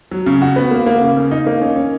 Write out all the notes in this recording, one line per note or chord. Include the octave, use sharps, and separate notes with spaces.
F#3
C#3
F#4
B3
A#3
A#3
C#3
C#3
D#4
A#3
C#4
C#4